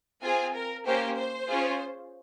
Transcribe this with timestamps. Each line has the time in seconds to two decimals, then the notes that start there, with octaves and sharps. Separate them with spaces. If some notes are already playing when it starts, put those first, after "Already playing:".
0.22 C4 F4 G#4 G#5
0.54 A#4
0.86 A#3 C#4 G4 C5
1.17 C5
1.49 C#4 F4 G#4